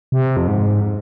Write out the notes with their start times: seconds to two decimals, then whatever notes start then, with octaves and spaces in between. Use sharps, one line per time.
0.12 C3
0.37 F2
0.48 G#2